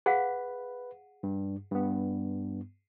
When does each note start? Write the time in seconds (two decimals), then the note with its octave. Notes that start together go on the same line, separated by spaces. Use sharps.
0.06 G#4 B4 F5 F#5
1.23 G2
1.71 G2 B3